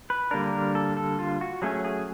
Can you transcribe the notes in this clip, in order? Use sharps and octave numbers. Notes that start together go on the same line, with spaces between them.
B4
D3 G3 A#3 D4 A#4
A#4
A4
A4
F4
F#4
F#3 A3 C#4 G#4
G#4